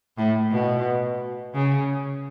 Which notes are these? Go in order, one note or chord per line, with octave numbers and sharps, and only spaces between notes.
A2
B2
C#3